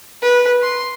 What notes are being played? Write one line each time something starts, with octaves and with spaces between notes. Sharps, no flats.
B4
C6